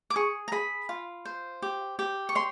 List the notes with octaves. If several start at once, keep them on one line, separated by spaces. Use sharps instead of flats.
D6
G#4 C#6
A#5
G#4 B5
F4
C5
G4
G4
C#6
C#5 C6